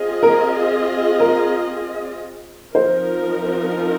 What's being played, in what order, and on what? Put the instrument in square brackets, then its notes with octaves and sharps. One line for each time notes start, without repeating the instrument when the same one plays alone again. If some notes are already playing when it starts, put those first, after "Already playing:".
Already playing: [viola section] C4 F4 G#4 D#5
[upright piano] A#4
A#4
[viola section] F3 C4 D#4 A#4 [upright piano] C5